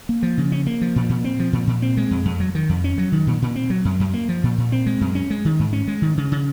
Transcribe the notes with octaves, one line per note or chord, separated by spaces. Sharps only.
A#3
F3
C#3
C#4
A#3
F3
A#2
A#2
C4
F3
A#2
A#2
C4
G#3
F2
F2
F#3
D#3
F2
C#4
F#3
D#3
A#2
A#2
C4
F#3
F#2
F#2
A#3
F3
A#2
A#2
C4
G#3
F#2
C#4
G#3
D#3
G#2
C#4
G#3
D#3
C#3
C#3